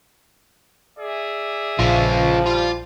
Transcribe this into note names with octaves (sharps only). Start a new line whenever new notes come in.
G#4 D5 E5
A#1 C#3 F3 F4
G3 F4